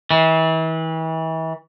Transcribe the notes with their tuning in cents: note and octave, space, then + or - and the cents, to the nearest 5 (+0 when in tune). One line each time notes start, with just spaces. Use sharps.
E3 -35